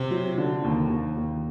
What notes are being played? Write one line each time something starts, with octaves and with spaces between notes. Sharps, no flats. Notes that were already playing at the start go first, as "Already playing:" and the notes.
Already playing: C3 C4
F#3
D3
D#2
D#2
D#2